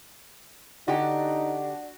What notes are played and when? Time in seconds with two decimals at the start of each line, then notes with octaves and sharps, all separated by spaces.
0.88 D3 D4 D#4 F#4 G4